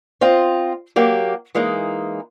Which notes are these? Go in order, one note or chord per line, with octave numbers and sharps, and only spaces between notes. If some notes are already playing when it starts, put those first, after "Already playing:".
C4 F4 D#5
F#3 A#3 G4
E3 G#3 A#3 D#4